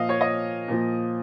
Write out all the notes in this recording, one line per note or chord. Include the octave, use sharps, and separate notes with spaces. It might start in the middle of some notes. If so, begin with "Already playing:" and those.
Already playing: A#2 F3 D#5 F5
C#5
D#5
A#2 F3